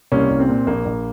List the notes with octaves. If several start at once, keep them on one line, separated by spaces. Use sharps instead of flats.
C2 A#3 C#4
C2
C4
A#2
A#1 A#3
A#1